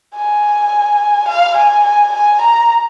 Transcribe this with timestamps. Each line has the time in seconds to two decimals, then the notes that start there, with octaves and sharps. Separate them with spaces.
0.16 G#5
1.28 F5
1.57 G#5
1.85 G#5
2.13 G#5
2.41 A#5